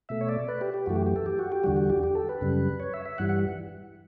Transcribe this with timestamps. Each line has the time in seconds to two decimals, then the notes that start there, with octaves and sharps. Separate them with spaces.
0.09 B2 A3 E5
0.21 C#5
0.29 D5
0.48 B4
0.61 G4
0.74 G4
0.86 F#2 E3 A3 F#4
0.96 G4
1.06 G4
1.16 A4
1.26 G4
1.39 F#4
1.52 G4
1.64 E2 D3 G3 F#4
1.77 F#4
1.90 G4
2.03 G4
2.15 A4
2.29 B4
2.41 F#2 C#3 G3
2.80 C#5
2.94 E5
3.05 E5
3.18 G2 E3 G3 F#5
3.29 F#5